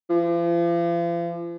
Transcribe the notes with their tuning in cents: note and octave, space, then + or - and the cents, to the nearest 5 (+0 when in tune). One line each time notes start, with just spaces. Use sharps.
F3 -40